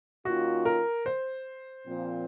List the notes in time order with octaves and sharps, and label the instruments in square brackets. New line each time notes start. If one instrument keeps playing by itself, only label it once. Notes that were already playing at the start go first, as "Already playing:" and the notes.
[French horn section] D#3 A#3 C#4 F4 [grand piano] F#4
[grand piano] A#4
C5
[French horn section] A#2 F3 C4